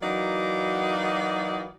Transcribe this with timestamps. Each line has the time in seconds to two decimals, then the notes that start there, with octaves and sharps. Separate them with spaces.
0.02 E3 F#3 A#3 D#4 F#4 D5